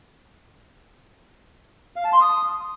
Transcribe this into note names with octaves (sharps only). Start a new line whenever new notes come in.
F5
A5
C6
D#6